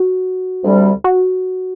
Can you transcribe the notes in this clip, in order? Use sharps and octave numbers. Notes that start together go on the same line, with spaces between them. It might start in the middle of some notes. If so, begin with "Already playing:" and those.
Already playing: F#4
D2 C3 G3
F#4